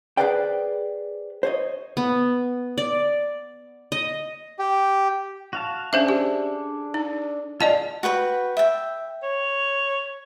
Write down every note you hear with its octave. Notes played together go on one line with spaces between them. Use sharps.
G#4 A4 B4 C5 D5 G5
C5 C#5 D#5
B3
D5
D#5
G4
F#4 F5 A5
C#4 D4 G#4 A4 C5 E5
G4
D#4
F4 G#4 D5 D#5 F5 A5
F#4 B4 G5 B5
E5 G5
C#5